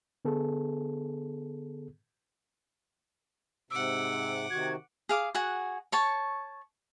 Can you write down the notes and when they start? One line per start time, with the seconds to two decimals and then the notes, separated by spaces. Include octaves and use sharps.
0.25 D3 B3 G#4 A4
3.71 G#2 C3 F#5 D6 E6
4.50 C3 D#3 F#4 G#6
5.09 G#4 F5 D6
5.35 F#4 G#4 F#5 G#5
5.92 C#5 A5 C#6